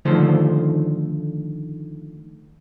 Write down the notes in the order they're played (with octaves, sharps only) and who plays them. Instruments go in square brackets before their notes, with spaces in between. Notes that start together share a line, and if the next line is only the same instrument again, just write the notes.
[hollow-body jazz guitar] D3 D#3 F3 A3 C5